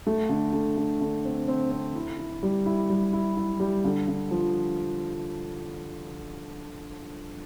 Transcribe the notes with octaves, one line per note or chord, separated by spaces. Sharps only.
A3
D3
D3
D3
D3
C4
C4
C4
E4
E4
G3
E4
G3
E4
E4
G3
D3
D3
F3